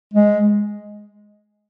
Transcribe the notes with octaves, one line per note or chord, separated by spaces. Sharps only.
G#3